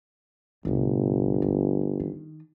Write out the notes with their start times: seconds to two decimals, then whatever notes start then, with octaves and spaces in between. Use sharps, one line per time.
0.65 G1 C2 A2
1.42 G#1 D2
2.00 D#3